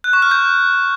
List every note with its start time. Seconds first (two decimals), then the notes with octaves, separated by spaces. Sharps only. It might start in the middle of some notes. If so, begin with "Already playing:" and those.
0.04 F#6
0.13 C#6
0.22 F6
0.31 G6